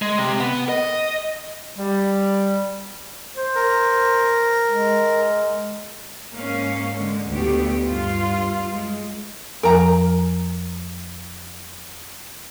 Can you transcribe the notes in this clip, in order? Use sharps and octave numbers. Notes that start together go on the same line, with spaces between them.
G#3
C3
B3
D#5
G3
C5
A#4
G#3
G#2 A#3 C#4 F5
D3 G#3
D2 A2 A3 B3 G4
G2 F4
G#3
F2 F3 A#4 G#5 A#5